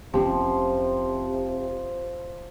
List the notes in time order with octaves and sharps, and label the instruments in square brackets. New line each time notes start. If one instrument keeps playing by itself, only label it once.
[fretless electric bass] F1 G#2 C#4 [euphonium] C3 [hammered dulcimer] F3 [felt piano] G4